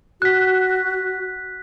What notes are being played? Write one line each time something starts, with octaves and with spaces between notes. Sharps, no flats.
F#4 F#6 B6